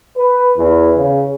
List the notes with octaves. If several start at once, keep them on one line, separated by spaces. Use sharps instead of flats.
B4
E2
C#3